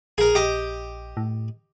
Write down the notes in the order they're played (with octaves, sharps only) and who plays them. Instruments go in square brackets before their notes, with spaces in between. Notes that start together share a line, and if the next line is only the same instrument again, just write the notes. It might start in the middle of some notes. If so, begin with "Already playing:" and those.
[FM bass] A#1 [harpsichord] G#4 A#4
[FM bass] A#1 [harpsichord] G4 D#5 D6
[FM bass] A2